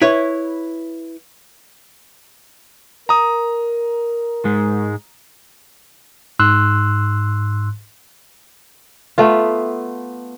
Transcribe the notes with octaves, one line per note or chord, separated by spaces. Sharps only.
E4 B4 C#5
A#4 A#5 D#6
G#2 G#3
G#2 C6 E6 F#6
A3 B3 F4